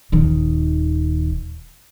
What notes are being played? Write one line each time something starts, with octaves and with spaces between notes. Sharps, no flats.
D#1 D#3